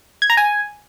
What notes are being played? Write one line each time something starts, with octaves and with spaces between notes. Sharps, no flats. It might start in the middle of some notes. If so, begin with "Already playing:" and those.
G#6
A#5
G#5